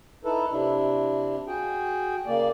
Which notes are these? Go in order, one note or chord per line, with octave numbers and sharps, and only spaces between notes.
D#4 E4 A4 B4
C3 D4 E4
F#4 G#4 G5
C#3 A#3 D5